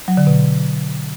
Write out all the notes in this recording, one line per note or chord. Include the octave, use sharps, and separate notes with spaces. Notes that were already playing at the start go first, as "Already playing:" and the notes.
F#3
D3
B2